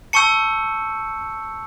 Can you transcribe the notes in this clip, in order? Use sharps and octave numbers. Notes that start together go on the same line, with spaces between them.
A5 C#6 E6 G6 C#7